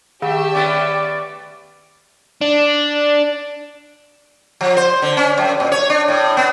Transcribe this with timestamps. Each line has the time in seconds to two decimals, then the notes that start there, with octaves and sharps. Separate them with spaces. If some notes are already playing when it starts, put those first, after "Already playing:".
0.22 D#3 A3 G4 E5
0.53 A3 B3 C#4 D5
2.41 D4
4.61 F3
4.77 C5
5.02 D3
5.17 C#4
5.38 F#2
5.60 A#2
5.72 C#5
5.90 D4
6.08 A2
6.37 B3